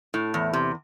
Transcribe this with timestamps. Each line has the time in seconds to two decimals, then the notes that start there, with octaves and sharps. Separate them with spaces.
0.14 A2
0.34 E2
0.53 C3